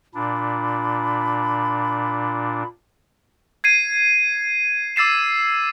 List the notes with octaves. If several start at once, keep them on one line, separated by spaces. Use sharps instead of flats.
A#2 D4 B5
G#6 C7 D#7
D6 E6 A6 C7 E7